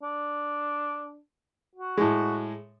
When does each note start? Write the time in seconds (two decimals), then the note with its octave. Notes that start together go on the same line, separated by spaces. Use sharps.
0.03 D4
1.76 F#4
1.97 A2 G#3